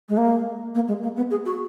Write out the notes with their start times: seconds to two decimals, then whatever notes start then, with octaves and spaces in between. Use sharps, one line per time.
0.09 G#3
0.17 A#3
0.75 A#3
0.88 G#3
1.03 A#3
1.16 B3
1.31 G#4
1.45 F#4